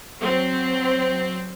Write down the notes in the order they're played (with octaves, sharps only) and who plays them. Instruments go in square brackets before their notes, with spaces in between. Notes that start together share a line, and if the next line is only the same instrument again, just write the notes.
[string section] F#3 C4